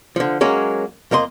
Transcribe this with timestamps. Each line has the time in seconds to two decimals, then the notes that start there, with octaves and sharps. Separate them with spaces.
0.16 D3 F3
0.41 F#3 G#3 A#3 C#4
1.11 F2 A#3 D#5 C6